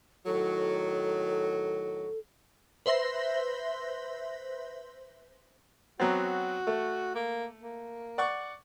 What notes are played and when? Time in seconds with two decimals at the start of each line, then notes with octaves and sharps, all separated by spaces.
0.26 A2 D#3 F#3 A4
2.86 B4 C5 E5 C6 A#6
6.00 F#3 B3 C4 F#4
6.67 A3
7.15 A#3
7.60 A#3
8.18 D5 F#5 C#6